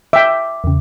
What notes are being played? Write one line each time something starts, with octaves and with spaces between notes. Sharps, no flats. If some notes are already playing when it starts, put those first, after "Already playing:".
E5 G5 D6
E2 C#3